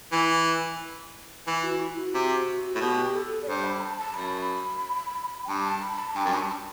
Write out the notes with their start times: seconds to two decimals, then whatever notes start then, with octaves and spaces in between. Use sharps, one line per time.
0.12 E3
1.47 E3 E4
1.64 F#4
1.80 E4
1.97 F#4
2.14 C3
2.75 A2
2.81 B2 G4
3.14 A4
3.42 D5
3.48 G2 C5
3.64 B5
3.81 A5
3.99 A5
4.14 F#2 B5
5.45 G5
5.49 G2 A5
5.66 A5
5.82 B5
5.98 A5
6.15 G2 G5
6.25 F#2
6.33 G2 A5